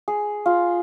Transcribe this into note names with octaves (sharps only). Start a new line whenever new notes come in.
G#4
F4